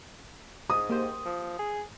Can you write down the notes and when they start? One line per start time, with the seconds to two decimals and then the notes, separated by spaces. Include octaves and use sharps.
0.70 G#2 D#6
0.90 A#3 G4 C5
1.25 F3
1.59 G#4